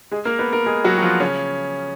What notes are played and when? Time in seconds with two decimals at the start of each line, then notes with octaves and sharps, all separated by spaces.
0.11 G#3 G#4
0.25 A#3 A#4
0.39 B3 B4
0.53 A#3 A#4
0.66 G#3 G#4
0.84 F#3 F#4
0.98 F#4
1.02 F3 F4
1.20 C#3 C#4